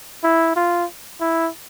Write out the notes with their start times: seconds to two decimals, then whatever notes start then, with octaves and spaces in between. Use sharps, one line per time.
0.24 E4
0.56 F4
1.20 E4